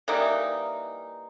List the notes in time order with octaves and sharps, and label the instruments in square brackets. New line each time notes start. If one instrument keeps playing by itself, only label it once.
[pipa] E3 G3 A#3 D#4